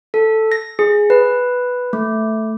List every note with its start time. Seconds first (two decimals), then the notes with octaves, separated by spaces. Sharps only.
0.14 A4
0.52 A#6
0.79 G#4
1.10 B4
1.93 A3